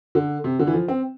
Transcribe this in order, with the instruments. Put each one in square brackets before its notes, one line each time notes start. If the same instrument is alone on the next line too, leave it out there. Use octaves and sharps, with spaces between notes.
[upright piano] D3
C3
D3
E3
F3
C4